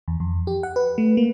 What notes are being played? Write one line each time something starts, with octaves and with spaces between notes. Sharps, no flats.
E2
F2
G4
F#5
B4
A3
A#3